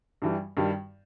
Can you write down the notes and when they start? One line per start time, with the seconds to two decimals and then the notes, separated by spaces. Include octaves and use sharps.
0.22 G2 E3 G3
0.57 G2 D#3 G3